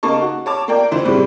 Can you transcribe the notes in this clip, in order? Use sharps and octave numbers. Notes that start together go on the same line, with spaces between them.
C#3 A#3 D#4 A5 C#6
F#4
C#5 A5 D6
A#3 A#4 D5 G5
D2 E3 C5 E5
A2 C3 E3 G3 G#3